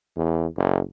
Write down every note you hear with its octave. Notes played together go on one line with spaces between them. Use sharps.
E2
F#1